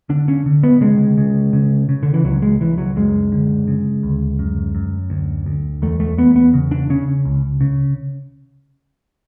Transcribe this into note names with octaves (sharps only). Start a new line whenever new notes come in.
D3 D4
C#4
D3
B3
C#3 G#3
C#3
C#3
C#3
D3
E3
C#2 F#3
G#3
C#2 E3
F#3
F#2 G#3
D3
C#3
D2
F#2
F#2
D2
D2
E2 A3
A3
E2 B3
B3
C#3
D4
C#3 C#4
C#2
C#3